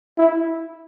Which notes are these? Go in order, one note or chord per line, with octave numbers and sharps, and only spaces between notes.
E4